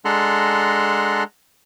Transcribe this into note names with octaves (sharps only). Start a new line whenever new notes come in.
G#3 D4 A4 F#5 A#5 C6